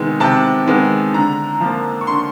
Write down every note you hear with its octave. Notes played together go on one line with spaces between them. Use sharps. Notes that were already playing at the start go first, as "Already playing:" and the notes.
Already playing: C3 D#3 G#3 B3
C3 A5
D#3 G#3 B3
D3 A#5
F3 A#3
C#6
D3 C6